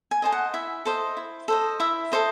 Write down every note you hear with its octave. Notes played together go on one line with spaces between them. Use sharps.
G#5
A4 C5 D#5 G#5
F#5
E4 E5
A4 C5 D#5
E4
A4 C5 D#5
E4 E5
A4 C5 D#5